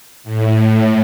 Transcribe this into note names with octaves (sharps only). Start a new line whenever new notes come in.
A2